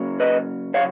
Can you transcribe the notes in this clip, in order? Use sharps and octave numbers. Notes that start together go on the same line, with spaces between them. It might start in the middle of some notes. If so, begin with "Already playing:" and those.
Already playing: C#3 F#3 A#3 C#4
B4 D#5
C#3 F#3 C#5 F5